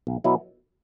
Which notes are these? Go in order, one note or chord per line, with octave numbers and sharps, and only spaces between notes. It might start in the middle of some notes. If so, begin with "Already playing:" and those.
B1
B2 F#3 B3 E4